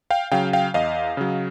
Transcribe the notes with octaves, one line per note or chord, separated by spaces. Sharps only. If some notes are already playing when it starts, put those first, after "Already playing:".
F5 G5
C#3 F#3 F5 G5
F5 G5
E2 D#5 F5
C#3 F#3